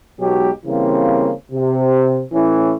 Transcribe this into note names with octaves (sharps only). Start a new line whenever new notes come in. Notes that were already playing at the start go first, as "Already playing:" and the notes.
B1 B2 F#3 G#3 G4
C#3 E3 G3 A#3 C4
C3
A2 E3 C#4